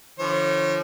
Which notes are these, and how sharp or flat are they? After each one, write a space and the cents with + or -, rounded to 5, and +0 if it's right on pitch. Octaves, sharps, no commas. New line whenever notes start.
D3 +0 F3 -35 C#5 -35